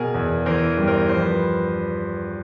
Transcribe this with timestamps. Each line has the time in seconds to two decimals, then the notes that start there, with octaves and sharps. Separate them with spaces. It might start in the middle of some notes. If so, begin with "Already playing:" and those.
Already playing: B2 G#4 A#4
0.14 E2
0.45 E3 A#4 C5
0.77 G2
0.87 A#4 C5
1.08 F3 C5
1.21 B4